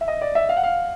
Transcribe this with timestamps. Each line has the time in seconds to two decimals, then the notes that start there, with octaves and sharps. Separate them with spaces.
0.01 E5
0.08 D#5
0.22 D5
0.35 E5
0.49 F5
0.57 F#5
0.63 F5